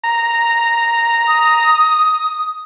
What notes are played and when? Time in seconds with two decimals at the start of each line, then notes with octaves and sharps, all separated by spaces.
0.04 A#5
1.28 D#6